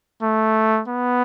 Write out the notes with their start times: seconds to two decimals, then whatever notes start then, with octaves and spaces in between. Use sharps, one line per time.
0.22 A3
0.88 B3